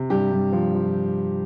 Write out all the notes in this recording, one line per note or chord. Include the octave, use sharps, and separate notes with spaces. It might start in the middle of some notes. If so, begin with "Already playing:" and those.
Already playing: C3
G2 G4
G2
F3
F3